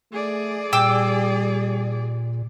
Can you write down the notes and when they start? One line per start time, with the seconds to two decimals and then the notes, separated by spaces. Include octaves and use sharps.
0.12 A3 G#4 D5
0.73 A#2 G3 G5 D6 E6